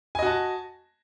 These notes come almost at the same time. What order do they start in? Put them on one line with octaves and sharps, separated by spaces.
G#5 D#5 F#4 A5